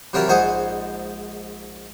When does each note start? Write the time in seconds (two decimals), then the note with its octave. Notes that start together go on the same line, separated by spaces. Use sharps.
0.13 C3 E3 F#3 F4 G4 A#4
0.28 A#1 G#2 C5 F#5 G#5 D#6